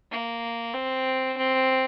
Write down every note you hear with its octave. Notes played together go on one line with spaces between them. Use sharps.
A#3
C4
C4